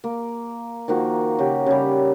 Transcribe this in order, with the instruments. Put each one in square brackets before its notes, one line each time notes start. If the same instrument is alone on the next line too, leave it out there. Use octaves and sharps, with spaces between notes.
[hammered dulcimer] A#3
D#3 F3 A#3 F#4
C#3 F#4 G4
C#3 G3